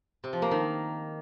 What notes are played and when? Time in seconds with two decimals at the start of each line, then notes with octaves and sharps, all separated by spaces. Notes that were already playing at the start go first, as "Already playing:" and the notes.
0.24 C3
0.33 F3
0.42 A#3
0.51 D#3